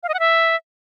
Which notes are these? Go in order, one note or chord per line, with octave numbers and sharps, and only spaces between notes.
F5
D#5
F#5
E5